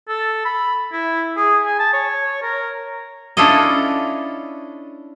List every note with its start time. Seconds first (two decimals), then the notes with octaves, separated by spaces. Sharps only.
0.08 A4
0.45 B5
0.92 E4
1.37 G#4
1.66 G#5
1.79 A5
1.93 C#5
2.42 A#4
3.37 C#4 D4 E4 F4 A4 D#5